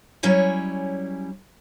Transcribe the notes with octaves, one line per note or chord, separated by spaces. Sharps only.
F#3 G3 C#4 E4 C#5 G#5